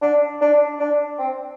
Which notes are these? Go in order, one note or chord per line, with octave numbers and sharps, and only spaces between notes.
D4
D4
D4
C4